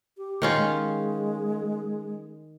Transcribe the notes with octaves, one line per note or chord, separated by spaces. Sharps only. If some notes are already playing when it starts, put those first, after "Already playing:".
G4
D#3 C#4 F4
G#3